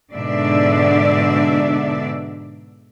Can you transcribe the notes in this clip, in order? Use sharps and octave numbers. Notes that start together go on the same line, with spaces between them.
G#2 B2 D3 D4 D5 E5